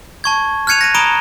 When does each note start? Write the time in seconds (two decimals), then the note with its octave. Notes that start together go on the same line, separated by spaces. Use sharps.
0.24 A5 C#6 G#6
0.67 F6 F#6 G#6 C#7 D#7 F7
0.81 A#6 D#7
0.94 A#5 B5 D#6 D7 E7 G7